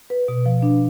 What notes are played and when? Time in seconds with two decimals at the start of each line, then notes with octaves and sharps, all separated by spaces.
0.10 B4
0.28 B2
0.46 F3
0.62 D4